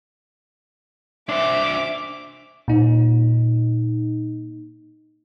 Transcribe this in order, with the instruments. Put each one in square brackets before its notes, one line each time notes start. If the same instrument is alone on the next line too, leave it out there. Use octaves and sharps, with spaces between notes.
[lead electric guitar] D4 C5 [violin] E5 D6
[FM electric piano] A#2 D#4